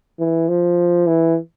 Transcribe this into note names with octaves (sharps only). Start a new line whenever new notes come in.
E3
F3
E3